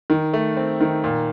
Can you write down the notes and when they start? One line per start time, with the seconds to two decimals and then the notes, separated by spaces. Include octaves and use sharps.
0.10 D#3
0.33 A3
0.57 C4
0.81 D#3
1.04 A#2